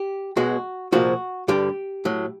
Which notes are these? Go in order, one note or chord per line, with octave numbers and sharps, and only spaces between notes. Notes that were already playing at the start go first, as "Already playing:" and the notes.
Already playing: G4
B1 B2 G#3 F#4
C2 A#2 F3 G#3 F#4
G2 D3 G3 G4
A2 F#3